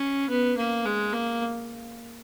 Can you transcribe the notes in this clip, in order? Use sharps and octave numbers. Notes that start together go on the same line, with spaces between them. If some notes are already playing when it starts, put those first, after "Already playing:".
Already playing: C#4
B3
A#3
G#3
A#3